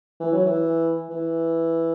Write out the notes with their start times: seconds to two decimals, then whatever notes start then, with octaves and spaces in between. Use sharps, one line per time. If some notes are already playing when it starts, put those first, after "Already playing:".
0.20 E3
0.32 F#3
0.46 E3
1.10 E3